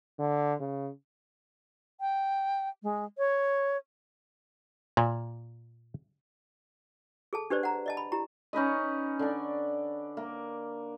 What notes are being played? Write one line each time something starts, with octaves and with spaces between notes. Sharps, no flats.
D3
C#3
G5
G#3
C#5
A#2
G#4 A4 A5
D4 G4 B4 C5 D5
F#5 A#5
D5 D#5 A5
B5
E4 G4 A#5
C#4 D#4 B4 D#5
D3 D4
A#3